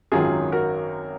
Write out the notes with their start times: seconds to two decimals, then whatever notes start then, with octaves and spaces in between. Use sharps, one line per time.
0.12 G#1 F#2 D#3 F#3 F4 G#4
0.52 F#4 A#4